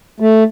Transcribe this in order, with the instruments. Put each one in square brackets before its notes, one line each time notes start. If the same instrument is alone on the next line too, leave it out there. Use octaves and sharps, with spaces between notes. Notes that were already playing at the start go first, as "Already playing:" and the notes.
[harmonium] A3